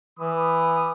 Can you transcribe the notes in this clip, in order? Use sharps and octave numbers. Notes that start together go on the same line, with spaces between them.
E3 B5 D6 D#6